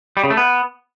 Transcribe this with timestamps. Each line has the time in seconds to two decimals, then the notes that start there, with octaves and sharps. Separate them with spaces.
0.17 G3
0.23 C#3
0.30 A3
0.37 B3